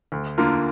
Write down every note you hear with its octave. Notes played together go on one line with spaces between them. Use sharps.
D2
D3 A#3 F4 A#4